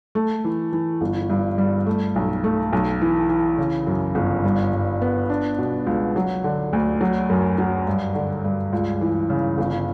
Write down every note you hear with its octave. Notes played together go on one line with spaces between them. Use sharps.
A3
E3
E3
G1
G2
G3
A3
B1
A3
B1
E3
E3
C#3
F#2
G1
G2
G2
B3
D4
B2
C#2
F#3
D3
D2
F#3
F#2
F#3
G2
D3
G2
C#2
E3
C#3
G1